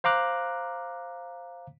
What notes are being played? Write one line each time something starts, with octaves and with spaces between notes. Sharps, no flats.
C5 F5 A#5 D6 F#6